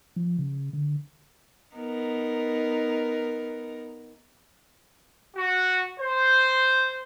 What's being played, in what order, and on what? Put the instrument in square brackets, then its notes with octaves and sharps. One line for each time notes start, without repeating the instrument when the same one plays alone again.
[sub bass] F3
C#3
D3
[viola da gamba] B3 D#4 A#4
[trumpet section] F#4
C5